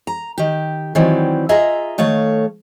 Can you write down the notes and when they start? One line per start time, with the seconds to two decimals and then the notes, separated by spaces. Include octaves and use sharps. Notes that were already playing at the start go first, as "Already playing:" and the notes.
0.07 A#5
0.38 D#3 G4
0.95 D#3 E3 F#3 G3 C4
1.49 F4 G#4 D#5 E5 A#5
1.98 D#3 A3 C#5 F5